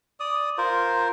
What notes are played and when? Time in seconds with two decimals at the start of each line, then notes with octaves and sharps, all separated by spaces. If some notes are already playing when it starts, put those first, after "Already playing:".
0.20 D5 D#6
0.58 F4 A#4 C5